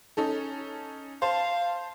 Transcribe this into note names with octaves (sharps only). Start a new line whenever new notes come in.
C#4 D#4 A4
C5 F5 A5